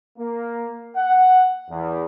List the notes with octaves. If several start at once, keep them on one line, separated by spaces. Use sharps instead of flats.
A#3
F#5
E2